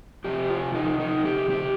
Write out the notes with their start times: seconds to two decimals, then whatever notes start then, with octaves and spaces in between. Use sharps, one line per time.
0.24 C3 F3 C4 G4
0.49 F4
0.75 D#4
1.00 D#4
1.25 G4
1.50 G4